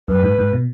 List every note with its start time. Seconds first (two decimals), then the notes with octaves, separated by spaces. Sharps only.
0.08 F#2 B4
0.23 G#2
0.38 G#2
0.53 B2